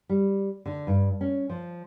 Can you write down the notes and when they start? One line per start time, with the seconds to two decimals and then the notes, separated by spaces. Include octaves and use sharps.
0.09 G3
0.66 D3
0.87 G2
1.21 C#4
1.49 F3